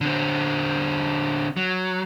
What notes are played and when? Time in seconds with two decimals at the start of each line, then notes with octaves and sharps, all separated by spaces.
0.01 D3 C4
1.57 F#3